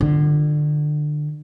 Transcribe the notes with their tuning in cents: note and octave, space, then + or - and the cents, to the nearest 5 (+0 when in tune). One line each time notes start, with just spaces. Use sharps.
D3 +25 F4 +0